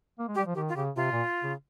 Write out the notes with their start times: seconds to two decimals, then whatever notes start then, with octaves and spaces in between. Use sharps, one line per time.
0.19 A#3
0.28 G#3
0.35 G3 G4
0.46 F3
0.55 D#3 G4
0.69 F4
0.75 C#3 G4
0.96 C3 F4
1.11 A#2
1.43 C#3